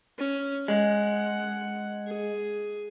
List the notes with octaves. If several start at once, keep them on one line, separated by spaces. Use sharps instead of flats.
C#4
G#3 F#5
G#4